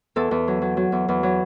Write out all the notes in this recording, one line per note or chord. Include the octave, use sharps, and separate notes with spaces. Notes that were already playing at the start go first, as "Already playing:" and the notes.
E2 A4
E2
F#3
F#3
F#3
E2
E2
F#3